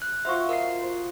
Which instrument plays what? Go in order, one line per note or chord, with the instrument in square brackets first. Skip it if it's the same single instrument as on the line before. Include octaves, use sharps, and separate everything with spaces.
[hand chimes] F#6
[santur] F4 F#4 C5 [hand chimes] E5 C#6
[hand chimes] A#4 C7 [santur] D#5
[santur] C5